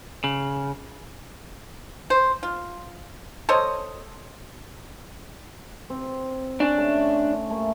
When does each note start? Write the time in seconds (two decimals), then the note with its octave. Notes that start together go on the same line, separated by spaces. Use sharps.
0.24 C#3
2.10 C5
2.43 F4
3.49 A4 C5 C#5 D#5
5.90 C4
6.60 C#4 D4
6.78 A3
7.50 A3 A#3